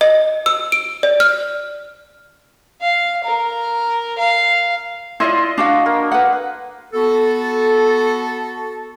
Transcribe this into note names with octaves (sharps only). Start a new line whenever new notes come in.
D#5
E6
D7
D5
F6
F5
A#4
F5
E4 F4 D5 D#5 C6
D4 F#4 F5
A#3
B4 F#5
B3 F#4 A4